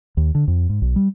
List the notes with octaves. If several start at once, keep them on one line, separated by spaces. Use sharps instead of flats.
D#2
D3
F2
G#2
B1
G3